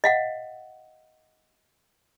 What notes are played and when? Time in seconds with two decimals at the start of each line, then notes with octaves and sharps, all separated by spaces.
0.04 D#5 F5 F#5